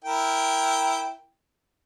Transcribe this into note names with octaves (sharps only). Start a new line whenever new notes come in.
E4 A#4 G5